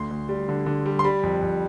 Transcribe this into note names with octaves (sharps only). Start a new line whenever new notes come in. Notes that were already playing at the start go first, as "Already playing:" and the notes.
Already playing: D2 C6
D2
G3
D3
D3
G3
C6
G3 B5
F2
F2